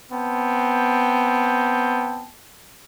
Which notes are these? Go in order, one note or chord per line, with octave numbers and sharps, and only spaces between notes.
B3 C4 G5 A5